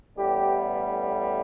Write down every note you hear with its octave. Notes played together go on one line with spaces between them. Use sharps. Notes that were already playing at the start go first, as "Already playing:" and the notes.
A1 A2 G3 B3 G4